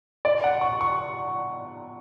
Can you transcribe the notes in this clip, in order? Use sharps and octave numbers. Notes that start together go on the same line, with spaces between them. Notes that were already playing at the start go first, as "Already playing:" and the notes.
D5
F#5
C#6
C#6